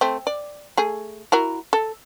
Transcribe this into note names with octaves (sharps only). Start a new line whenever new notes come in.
A3 C4
D5
A3 G#4
E4 F#4 A#4
A4